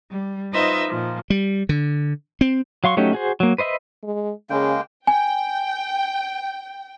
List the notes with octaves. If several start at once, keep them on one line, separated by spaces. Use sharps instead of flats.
G3
D#4 F4 B4 C5 D#5 E5
A#2 F3
G3
D3
C4
F#3 F5 C6 C#6
F#3 A3 C#4 D#4 G4
F#4 G#4 C5
F#3 A#3
B4 C5 D#5 E5 B5
G#3
C#3 G#3 A#3 G5
G5 G#5